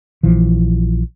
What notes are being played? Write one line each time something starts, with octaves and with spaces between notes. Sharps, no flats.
A#1 E3 F3